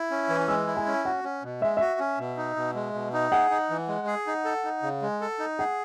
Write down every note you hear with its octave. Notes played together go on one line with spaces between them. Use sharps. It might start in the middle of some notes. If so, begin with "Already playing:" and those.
Already playing: E4
C#4
E3
G#3 E6
E4
G#5
C#4
F#4 F#5
C#4
B2
G#3 E5
F#4 E5
C#4
B2
D#4
B2
G#3
B2
D#4
G#4 F#5
D#4
E3
G#3
G#4
D#4
A4
D#4
C#3
G#3
A4
D#4
G#4 F#5